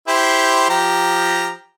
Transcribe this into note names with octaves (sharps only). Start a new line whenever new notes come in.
E4 G4 C5
F3 G4 A#5